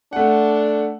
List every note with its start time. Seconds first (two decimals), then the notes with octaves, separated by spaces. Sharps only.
0.13 A3 D4 F#5